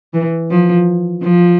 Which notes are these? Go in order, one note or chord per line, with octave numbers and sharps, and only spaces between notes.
E3
F3
F3